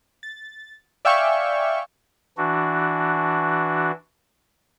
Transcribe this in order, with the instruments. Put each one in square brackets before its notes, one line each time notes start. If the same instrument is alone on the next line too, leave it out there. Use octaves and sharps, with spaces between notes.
[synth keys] A6
D5 E5 F5 G5 G#5 C#6
[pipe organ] E3 D4 F#4